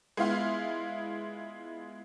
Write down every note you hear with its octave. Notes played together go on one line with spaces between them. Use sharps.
G#3 B3 E4 F4 F5 C6